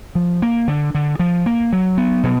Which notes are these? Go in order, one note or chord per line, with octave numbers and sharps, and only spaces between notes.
F3
A#3
D3
D3
F3
A#3
F#3
B3
B2